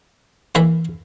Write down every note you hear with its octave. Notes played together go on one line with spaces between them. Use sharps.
E3 A#3 E4 A#4 E5